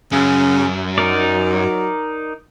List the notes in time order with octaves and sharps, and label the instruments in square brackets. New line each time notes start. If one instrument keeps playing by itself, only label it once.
[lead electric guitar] F#2 [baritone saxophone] C#3
[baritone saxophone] F#3 [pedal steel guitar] D#4 A#4 D5